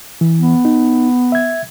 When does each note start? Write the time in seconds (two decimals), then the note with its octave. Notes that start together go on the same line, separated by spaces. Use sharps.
0.21 E3
0.40 B3
0.65 D#4
1.32 E5 G#6